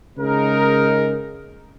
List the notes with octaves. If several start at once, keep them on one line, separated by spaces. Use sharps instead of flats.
C#3 G#3 D#4 A#4